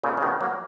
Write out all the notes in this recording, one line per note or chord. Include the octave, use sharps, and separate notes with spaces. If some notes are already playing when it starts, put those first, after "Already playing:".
A#2 C#3
C#3
B2 D#3
F#3 A#3